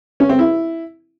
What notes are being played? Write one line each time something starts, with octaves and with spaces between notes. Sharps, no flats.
C#4
C4
E4